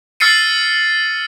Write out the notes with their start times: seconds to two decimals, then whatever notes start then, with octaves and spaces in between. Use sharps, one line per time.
0.20 E6 F6 A6 C7 C#7 D#7